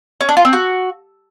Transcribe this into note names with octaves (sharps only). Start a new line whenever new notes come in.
C#4
D4
F4
C4
F#4